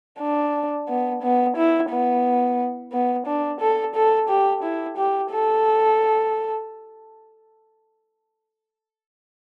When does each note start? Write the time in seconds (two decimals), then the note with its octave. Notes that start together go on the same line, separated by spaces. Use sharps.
0.19 D4
0.89 B3
1.23 B3
1.57 E4
1.90 B3
2.93 B3
3.27 D4
3.61 A4
3.95 A4
4.29 G4
4.63 E4
4.97 G4
5.31 A4